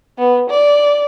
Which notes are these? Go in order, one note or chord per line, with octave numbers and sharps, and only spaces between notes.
B3
D5